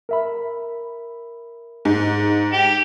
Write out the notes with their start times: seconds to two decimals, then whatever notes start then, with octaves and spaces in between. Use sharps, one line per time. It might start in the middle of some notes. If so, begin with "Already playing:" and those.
0.09 A#4 E5 B5
1.85 G#2
2.53 G4